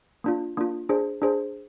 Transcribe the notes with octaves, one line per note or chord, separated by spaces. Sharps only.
A#3 D4 F4
A#3 D4 F4
D4 G#4 C5
D4 G#4 C5